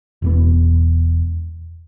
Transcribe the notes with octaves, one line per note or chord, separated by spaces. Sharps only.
E1 E2 B3